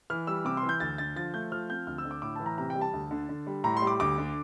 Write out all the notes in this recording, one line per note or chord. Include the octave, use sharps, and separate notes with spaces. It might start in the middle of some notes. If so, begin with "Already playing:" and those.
E3 F6
G3 E6
C3 D6
C6
E3
G6
D2 A6
D3 A6
F3 A6
A3 G6
F3 F6
C4 G6
D2 F6
E6
D3
D6
A2 D6
E3 A5
A#5
C3 A#5
G5
G3
A5
D2
D3
D3
G3
A2 A#5
C6
G3
D6
D2 D6
D3